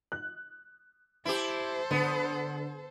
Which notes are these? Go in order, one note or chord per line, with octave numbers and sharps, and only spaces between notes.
F#6
E4 G4 A4 C5
D3 B3